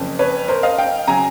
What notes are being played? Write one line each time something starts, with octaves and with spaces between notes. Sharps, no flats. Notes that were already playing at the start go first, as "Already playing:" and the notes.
Already playing: F#1 F2 C#3
B4 C#5
A#4 C5
D#5 F5
F5 G5
C#3 F#3 G#5 A#5